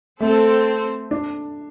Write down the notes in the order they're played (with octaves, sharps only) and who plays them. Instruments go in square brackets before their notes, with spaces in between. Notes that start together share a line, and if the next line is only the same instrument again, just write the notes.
[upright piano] A3 [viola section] C4 A4 C5
[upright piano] D4